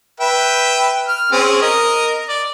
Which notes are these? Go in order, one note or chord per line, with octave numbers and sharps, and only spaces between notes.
B4 E5 G5
F6
C4 C#4 G#4
A#4 D#5
D5